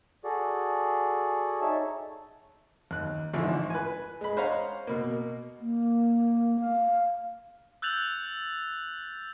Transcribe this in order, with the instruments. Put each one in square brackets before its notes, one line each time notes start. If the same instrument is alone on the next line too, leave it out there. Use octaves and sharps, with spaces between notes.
[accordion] F#4 G#4 A4 D5
D#4 C#5 E5 A5
[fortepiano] D#2 F#6
A1 G#2 D3 F3 E4
B4 G#5
G#3 B5
C5 C#5 D#5 F5 F#5 A#5
B2 A#3
[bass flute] A#3
F5
[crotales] E6 F#6 G6 A6 F7 F#7